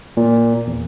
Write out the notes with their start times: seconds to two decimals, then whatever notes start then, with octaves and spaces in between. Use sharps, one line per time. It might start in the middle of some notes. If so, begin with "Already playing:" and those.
0.17 A#2
0.67 E2